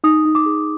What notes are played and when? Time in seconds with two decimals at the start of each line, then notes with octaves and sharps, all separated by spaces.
0.04 D#4 D#6
0.25 D#4
0.35 D6
0.46 G#4